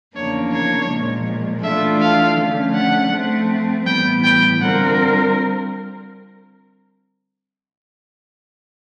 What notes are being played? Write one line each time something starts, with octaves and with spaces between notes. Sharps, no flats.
E2 C#3 F3 A#3 D4 C#5
C#5
A#2 F3 G#3
E3 A3 D4 F4 A4 E5
F5
D3 F3 A3 C#4
F#5
F3 A3 C4
A2 E3 G3 B3 G5
G5
D3 G3 C4 F4 A#4 F#5